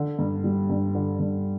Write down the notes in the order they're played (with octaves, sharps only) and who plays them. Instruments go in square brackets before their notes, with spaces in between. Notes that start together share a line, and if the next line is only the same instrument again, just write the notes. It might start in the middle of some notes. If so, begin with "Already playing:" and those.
Already playing: [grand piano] D3
G2
G3
G2
D3
G2